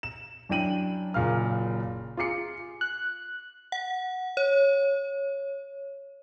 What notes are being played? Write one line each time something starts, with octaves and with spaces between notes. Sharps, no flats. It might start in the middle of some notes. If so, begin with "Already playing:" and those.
E7
F#2 D4 E4 G5 D#7 F#7
F#1 A#2 F5 F6
F4 G#4 D6 C7 C#7
F#6
F#5
C#5